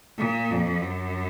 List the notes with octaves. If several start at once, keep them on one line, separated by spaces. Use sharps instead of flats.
A#2
F2
F#2